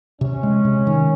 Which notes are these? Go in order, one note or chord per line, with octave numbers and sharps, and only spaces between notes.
C3 C#4
G#3
C3
D#3